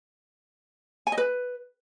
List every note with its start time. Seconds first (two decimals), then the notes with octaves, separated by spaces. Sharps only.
1.07 G#5
1.12 D#5
1.18 B4